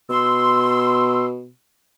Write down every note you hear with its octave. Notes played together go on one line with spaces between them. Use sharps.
B2 C6 E6